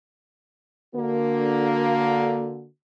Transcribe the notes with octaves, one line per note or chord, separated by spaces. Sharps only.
D3 A#3 F#4